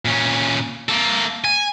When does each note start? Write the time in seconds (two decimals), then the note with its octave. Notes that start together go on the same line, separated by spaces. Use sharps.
0.05 A#2 C#4
0.89 A#3 A4
1.45 G#5